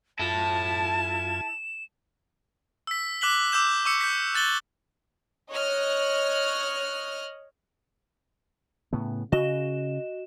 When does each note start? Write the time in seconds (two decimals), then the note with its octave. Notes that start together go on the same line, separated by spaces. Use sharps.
0.19 F#2 E4 F4 A4 A5 G#6 E7
2.87 E6 B6
3.21 D6 F#6 B6 F#7 G7
3.52 D6 E6 G6 E7
3.85 C#6 D6 E6 C#7
4.01 G6 B6
4.34 F#6 A6 F#7 G7
5.52 C#5 D#5 F6 F#6
8.93 A2 C#3 B3
9.32 C#3 F#4 D#5 E7